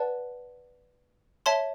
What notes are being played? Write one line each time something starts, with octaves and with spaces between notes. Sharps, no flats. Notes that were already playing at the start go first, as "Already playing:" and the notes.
Already playing: B4 D5 F#5 A5
C#5 E5 A5 C6